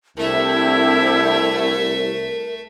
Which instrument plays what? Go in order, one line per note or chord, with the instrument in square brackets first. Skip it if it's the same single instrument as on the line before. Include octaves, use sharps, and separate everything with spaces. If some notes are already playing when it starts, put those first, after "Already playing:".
[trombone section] C2 [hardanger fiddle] A3 E5 [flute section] D4 E4 G4 [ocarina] A#4